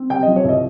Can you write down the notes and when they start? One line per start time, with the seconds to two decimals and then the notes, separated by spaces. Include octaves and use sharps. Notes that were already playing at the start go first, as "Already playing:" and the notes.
Already playing: C4
0.10 C3 G5
0.23 F3 D#5
0.36 C#5
0.44 C2 D#5